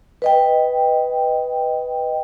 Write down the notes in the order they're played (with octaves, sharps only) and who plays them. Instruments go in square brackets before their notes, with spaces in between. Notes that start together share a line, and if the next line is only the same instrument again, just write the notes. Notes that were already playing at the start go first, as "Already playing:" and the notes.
[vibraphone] B4 D#5 G5